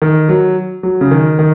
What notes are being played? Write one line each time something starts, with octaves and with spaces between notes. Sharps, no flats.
D#3
F#3
F#3
C#3
D#3
D#3